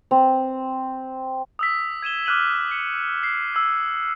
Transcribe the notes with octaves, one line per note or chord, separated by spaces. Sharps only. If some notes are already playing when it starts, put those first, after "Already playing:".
C4
D#6 E6 B6
G#6 D#7 E7 G7
D6 F6 F#6 D#7 F#7
C#7
C7
E6 G#6